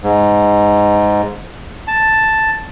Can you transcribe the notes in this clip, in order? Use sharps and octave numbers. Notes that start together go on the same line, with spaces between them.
G#2
A5